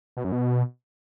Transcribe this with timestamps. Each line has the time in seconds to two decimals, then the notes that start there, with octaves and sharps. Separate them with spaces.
0.17 B2
0.24 F#2
0.32 B2